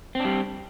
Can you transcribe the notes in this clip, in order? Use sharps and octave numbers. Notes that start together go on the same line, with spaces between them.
G3 C4 D4